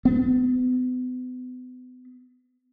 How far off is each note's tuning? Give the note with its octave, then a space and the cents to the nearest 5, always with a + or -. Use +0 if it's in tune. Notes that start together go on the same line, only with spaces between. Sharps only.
B3 +35